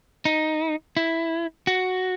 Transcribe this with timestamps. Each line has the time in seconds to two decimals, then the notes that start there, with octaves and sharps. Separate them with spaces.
0.25 D#4
0.97 E4
1.67 F#4